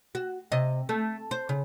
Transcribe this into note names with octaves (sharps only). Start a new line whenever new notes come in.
F#4
C3 D#5
A3
C5
C#3